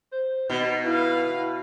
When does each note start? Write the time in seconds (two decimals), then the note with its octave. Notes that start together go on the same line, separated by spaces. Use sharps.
0.12 C5
0.50 B2 D#4
0.85 E4 B4 F5